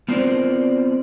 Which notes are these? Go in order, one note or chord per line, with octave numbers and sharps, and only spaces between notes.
B3 C4 F4 A#4 C5 D5